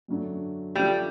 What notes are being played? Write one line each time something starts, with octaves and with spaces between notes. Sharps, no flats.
F#2 D3 F#3 A3 D4
F3 G3 A3 D4